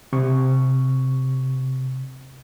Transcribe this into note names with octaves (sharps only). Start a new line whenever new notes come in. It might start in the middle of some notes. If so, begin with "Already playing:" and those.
C3 C#6